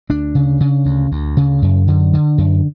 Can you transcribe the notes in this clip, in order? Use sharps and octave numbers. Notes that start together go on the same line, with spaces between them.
D2 D4
C#3
C#3
D2
D2
C#3
F#2
D3
D3
F#2